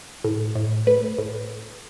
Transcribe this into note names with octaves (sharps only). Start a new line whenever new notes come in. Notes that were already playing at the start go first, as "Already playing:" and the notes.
A2
A2
A3 B4
A2